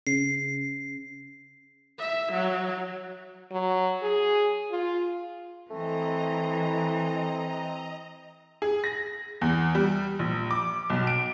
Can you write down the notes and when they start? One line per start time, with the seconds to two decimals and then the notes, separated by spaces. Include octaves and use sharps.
0.07 C#3 C7
1.99 E5
2.32 F#3
3.52 F#3
4.03 G#4
4.71 F4
5.70 E3 A3 C4 D#5 A#5
8.62 G#4
8.84 A#6
9.41 E2
9.75 G3
10.19 A#1
10.51 D6
10.90 B1
11.07 D7